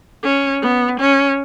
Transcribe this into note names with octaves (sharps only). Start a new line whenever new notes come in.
C#4
B3
C#4